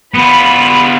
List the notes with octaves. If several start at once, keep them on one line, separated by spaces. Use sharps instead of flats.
B3 F4 B5